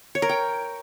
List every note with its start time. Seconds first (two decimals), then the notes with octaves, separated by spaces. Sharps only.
0.15 C#5
0.22 A#4
0.29 G5